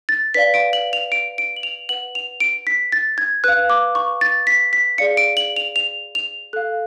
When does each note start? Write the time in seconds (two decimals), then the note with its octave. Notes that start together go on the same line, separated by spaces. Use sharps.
0.09 A6
0.34 B4 D5 F5 B6
0.54 D7
0.73 F#7
0.93 F7
1.12 D7
1.38 D7
1.56 F#7
1.63 F7
1.89 B4 F#5 F#7
2.15 F7
2.40 D7
2.67 B6
2.92 A6
3.18 G#6
3.44 B4 F5 F#6
3.70 D6
3.95 C#6
4.21 A6
4.47 B6
4.73 B6
4.98 G#4 D5 F5 C#7
5.17 D7
5.37 F#7
5.56 F7
5.76 F7
6.15 F7
6.53 A4 F5 F#6